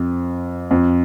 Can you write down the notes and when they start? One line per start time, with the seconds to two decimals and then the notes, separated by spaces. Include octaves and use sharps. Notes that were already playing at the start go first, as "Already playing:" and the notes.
Already playing: F2
0.71 F2